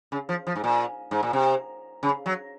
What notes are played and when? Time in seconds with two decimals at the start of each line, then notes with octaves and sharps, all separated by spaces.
0.12 C#3
0.29 F3
0.47 F3
0.56 G#2
0.64 A#2
1.11 G#2
1.23 A#2
1.33 C3
2.03 C#3
2.26 F#3